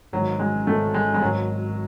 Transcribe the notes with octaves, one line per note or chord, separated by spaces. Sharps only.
G#1 G#2 D#3 F#3
G#3
G#1 G#2 D#3 A3
G#3
G#3
G#1 G#2 D#3 F#3